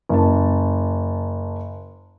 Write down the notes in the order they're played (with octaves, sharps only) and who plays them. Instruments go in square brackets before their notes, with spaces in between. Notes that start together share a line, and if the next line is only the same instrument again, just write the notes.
[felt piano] F#1 A5